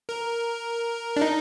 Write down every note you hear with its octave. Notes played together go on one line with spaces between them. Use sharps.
A#4
D4
D#4